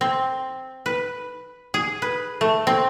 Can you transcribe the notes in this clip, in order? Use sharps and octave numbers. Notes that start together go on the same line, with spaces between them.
C4
B4
G#4
B4
A3
C4